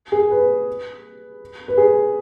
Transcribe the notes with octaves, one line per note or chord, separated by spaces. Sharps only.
G#4
B4
B4
G#4